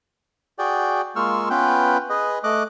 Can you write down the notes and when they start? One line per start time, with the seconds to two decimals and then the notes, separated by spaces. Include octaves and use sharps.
0.59 F#4 G#4 D5 G5
1.16 G#3 A#3 F4 C#6 E6 F6
1.50 B3 C#4 F4 B4 G5
2.10 G#4 B4 D#5
2.44 A3 D#5 D6 F#6